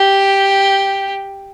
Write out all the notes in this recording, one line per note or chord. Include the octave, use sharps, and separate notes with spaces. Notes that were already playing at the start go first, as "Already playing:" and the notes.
Already playing: G4